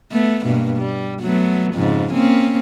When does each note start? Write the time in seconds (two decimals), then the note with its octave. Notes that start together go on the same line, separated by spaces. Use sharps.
0.12 A3 B3
0.45 G2 B2 A#3
0.77 G3
1.21 F#3 A3 B3
1.73 F2 G#2 C#3
2.13 A#3 C4 C#4